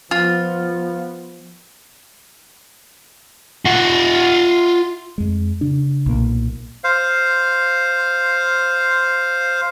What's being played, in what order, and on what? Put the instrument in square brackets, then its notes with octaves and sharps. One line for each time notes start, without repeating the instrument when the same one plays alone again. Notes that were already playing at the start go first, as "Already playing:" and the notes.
[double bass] F3 B3 [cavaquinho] F4
[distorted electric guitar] F4 F#5
[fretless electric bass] F2 G#3
C#3 D4
B1 A#2 A#3
[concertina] C5 F5